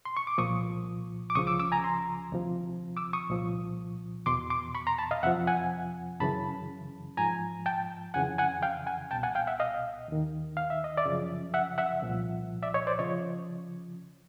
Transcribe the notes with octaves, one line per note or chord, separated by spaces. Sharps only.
C6
C#6
D6
C2 A#2 F3 C#6 D#6
D6
C#2 C#3 F3 C#6 D#6
D6 E6
D6 E6
G#5 A#5
A#5 C6
D2 C3 F3
D6 E6
C#6 D#6
C2 A#2 F3
E2 B2 C6 D6
C6 D6
B5 C#6
A#5 C6
A5 B5
D#5 F5
F2 C3 F3 E5 F#5
F#5 G#5
F#2 C#3 E3 A5 B5
G#2 F3 G#5 A#5
G5 A5
F2 C#3 E3 F#5 G#5
F#5 G#5
F5 G5
F#5 G#5
C2 B2 G5 A5
F#5 G#5
F5 G5
E5 F#5
D#5 F5
D#2 D#3
F5
E5
D#5
D5 E5
F#2 C#3 F3
E5 F#5
E5 F#5
C2 A#2 F3
D5 E5
C#5 D#5
C5 D5
C#3 F3 C#5 D#5